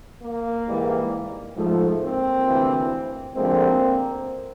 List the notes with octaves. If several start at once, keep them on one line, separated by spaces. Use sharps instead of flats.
A#3
G#2 E3 G3
G#2 F3 A3
A#3 C4
D2 C3 E3
D2 D3 F3 G#3 A#3 C4